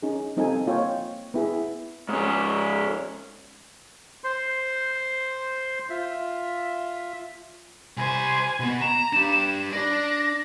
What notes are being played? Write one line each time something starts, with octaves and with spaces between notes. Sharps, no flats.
C#4 D#4 G#4
G3 C4 D#4 F4 A4 G#5
A#3 F4 C#5 D#5 G5
B3 E4 G#4
G#2 C#4
C5 C6
F4 E5
C2 C5 G#5
B2 B3
A#5 E7
D4 G4
D4 D5 A#6